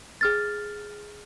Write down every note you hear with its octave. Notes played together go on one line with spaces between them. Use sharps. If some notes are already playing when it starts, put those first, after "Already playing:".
G#4 F6 A6